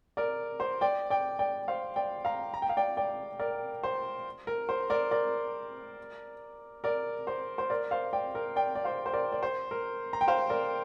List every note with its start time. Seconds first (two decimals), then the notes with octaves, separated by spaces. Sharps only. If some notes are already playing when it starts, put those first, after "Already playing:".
0.17 A#4 D5
0.60 C5
0.81 D5 G5
1.10 D5 G5
1.39 D5 G5
1.68 C5 F5
1.96 D5 G5
2.25 F5 A#5
2.54 A#5
2.62 G5
2.69 F5
2.77 D5 G5
2.97 D5 G5
3.39 A#4 D5
3.83 C5
4.47 A#4
4.69 C5
4.90 A#4 D5
5.11 A#4 D5
6.84 A#4 D5
7.27 C5
7.58 C5
7.70 A#4 D5
7.91 C5 F5
8.13 D5 G5
8.35 A#4
8.56 D5 G5
8.75 D5
8.84 C5 F5
9.06 C5
9.13 A#4 D5
9.32 D5
9.43 C5
9.71 A#4
10.13 A#5
10.21 G5
10.28 C5 F5
10.50 A#4 D5